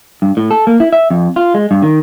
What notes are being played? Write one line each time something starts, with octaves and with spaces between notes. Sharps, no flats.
G2
A2
A4
A#3
E4
E5
F2
F4
G#3
G2
D#3